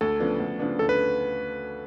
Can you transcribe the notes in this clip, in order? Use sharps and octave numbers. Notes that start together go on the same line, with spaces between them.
D2 A4
C#3 F3 B3 D4
D2
C#3 F3 B3 D4
D2 A4
B4